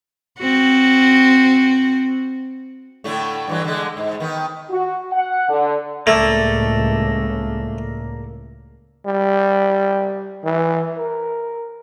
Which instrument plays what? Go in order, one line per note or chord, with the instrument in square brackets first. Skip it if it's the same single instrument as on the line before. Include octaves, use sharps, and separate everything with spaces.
[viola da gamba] C4 F#4
[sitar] A2 D3 A3
G2 E3 F#3
D3 G#3
G#2
D#3 B3
[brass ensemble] F#4
F#5
D3
[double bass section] C#2 A2 [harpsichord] A3 [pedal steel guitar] A#3 A4 D5
[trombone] G3
E3
A#4